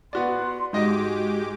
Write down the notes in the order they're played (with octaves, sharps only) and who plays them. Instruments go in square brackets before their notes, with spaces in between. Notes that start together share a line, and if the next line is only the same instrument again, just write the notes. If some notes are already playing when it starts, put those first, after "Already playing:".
[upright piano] B3 F#4 D5 [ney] C6
[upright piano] G#2 D#5 [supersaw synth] G#3 G4 D6 [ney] F#4